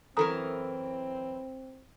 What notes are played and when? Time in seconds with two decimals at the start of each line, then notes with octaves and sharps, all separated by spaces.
0.17 F#2 E3 C4 A4 A#4 A#5 D#6